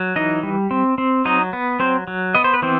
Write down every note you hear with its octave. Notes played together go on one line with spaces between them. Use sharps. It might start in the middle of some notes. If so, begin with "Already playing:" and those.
Already playing: F#3
E3 D#4 D#5
G3
C4
C4
F#3 D#4 D#5
B3
F#3 C4 C5
F#3
B3 D#5
C5
B4
E3 C4 C5